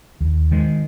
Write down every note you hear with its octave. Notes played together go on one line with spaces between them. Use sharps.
D#2
D#3 G#3